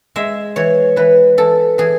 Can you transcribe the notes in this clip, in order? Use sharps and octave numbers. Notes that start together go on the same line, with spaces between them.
G#3 E5
E3 C#5
E3 B4
E3 A4
E3 G#4